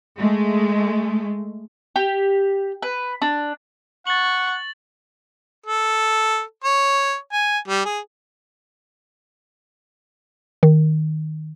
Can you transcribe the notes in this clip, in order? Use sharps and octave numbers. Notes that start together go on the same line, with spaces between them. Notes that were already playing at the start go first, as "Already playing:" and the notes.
G#3 A3
G4
B4
D4
F#5 C#6 A6 F#7
A4
C#5
G#5
G3
G#4
D#3